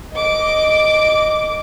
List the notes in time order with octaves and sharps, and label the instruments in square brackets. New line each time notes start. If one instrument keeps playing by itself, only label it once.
[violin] D#5 D6